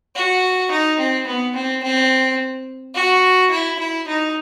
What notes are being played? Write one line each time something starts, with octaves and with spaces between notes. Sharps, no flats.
F#4
D#4
C4
B3
C4
C4
F#4
E4
E4
D#4